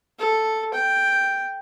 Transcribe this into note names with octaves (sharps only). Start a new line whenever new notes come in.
A4
G5